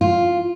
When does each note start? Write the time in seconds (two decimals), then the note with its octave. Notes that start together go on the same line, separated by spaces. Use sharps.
0.01 F4